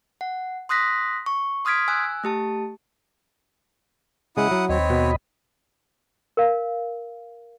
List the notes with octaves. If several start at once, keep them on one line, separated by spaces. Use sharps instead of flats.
F#5
C6 D#6 F#6 A#6 B6
C#6
C6 D#6 F6 G#6 B6 D7
G#5 E6 F#6
A3 G4 A5
C#3 G#3 E4 F#5 D#6
F#3
D#2 C4 C#5 D#5 B5
B2
A#4 F5